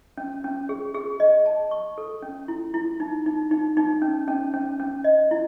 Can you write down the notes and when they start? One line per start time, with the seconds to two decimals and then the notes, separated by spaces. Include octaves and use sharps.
0.17 C#4
0.44 C#4
0.69 G#4
0.95 G#4
1.20 D#5
1.46 A5
1.71 C#6
1.98 A4
2.22 C#4
2.48 E4
2.74 E4
3.00 D#4
3.26 D#4
3.51 D#4
3.77 D#4
4.02 C#4
4.28 C#4
4.54 C#4
4.80 C#4
5.04 D#5
5.31 E4